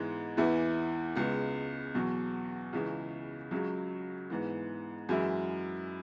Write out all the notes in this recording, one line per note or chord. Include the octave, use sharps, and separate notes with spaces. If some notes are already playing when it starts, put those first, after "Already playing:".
Already playing: G#2 E3 G#3 B3
E2 E3 B3 E4
C#2 C#3 G#3 B3
E2 B2 F#3
C#2 C#3 E3 C#4
C#2 C#3 F#3
G#2 E3 B3
F#2 E3 G#3 E4